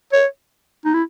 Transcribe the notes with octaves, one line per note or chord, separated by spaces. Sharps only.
C#5
D#4
E4